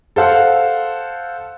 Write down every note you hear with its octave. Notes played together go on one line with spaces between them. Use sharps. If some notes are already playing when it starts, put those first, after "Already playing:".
A4 C5 F5 F#5